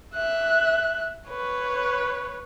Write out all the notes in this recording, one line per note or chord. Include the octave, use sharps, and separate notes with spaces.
E5 F#6
B4 C#5